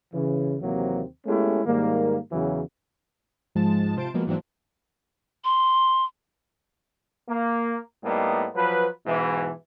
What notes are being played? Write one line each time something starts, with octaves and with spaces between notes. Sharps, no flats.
C#3 E3
D#2 C3 E3 F#3 A#3 C4
G#3 A3 B3 C#4 E4 G4
G#2 D#3 G3 A#3
E2 C#3 E3 F#3
G#2 F3 G#3 A5
C3 F4 C5 A5 D7
F3 F#3 G#3 A#3 B3
G#2 E3 F#3 A#3 C4 D4
C6
A#3
A2 G3 A#3 B3 D#4
F3 F#3 B4
G#2 B2 E3